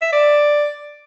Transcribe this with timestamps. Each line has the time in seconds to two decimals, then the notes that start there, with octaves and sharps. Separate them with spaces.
0.02 E5
0.12 D5